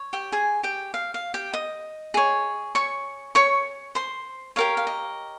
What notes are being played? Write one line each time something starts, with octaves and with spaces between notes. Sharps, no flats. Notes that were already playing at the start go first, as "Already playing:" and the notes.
Already playing: C#5
G4 G5
G#4 G#5
G4 G5
F5
F5
G4 G5
D#5 D#6
G#4 C#5
C#5 C#6
C#5 C#6
C5 C6
G4 A#4 C#5 F5
F5
D#5